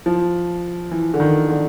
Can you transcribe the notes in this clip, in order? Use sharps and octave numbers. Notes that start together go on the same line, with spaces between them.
F3
E3
D3
D#3
D3